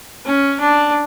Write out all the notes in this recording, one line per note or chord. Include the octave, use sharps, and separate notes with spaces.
C#4
D4